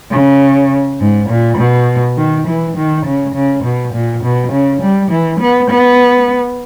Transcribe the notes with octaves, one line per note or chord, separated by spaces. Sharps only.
C#3
G#2
A#2
B2
D#3
E3
D#3
C#3
C#3
B2
A#2
B2
C#3
G3
E3
B3
B3